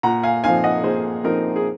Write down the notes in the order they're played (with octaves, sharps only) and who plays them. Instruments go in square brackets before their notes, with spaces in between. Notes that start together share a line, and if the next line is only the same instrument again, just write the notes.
[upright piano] A#2 F#5 A#5
F5 G#5
F3 C4 D#4 F5 G#5
D#5 F#5
A#2 G#4 C5
F3 C4 D#4 A#4
G#4